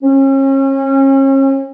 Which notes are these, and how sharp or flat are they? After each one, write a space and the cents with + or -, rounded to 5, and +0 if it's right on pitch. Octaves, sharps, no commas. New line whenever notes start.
C#4 -35